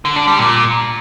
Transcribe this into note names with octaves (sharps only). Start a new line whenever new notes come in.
D3
D4
G3
A#2